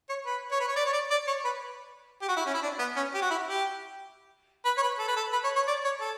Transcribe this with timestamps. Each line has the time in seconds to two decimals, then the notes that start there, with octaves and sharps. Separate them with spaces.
0.09 C#5
0.26 B4
0.52 C#5
0.60 B4
0.68 C#5
0.76 D5
0.86 C#5
0.93 D5
1.10 D5
1.27 C#5
1.44 B4
2.22 G4
2.28 F#4
2.37 E4
2.46 C#4
2.54 E4
2.63 D4
2.79 B3
2.96 C#4
3.14 G4
3.22 F#4
3.30 E4
3.47 G4
4.65 B4
4.77 C#5
4.82 B4
4.99 A4
5.08 B4
5.16 A4
5.32 B4
5.44 C#5
5.56 C#5
5.67 D5
5.84 C#5
6.01 A4